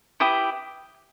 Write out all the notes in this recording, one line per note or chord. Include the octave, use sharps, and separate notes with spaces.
E4 G4 B4 D#6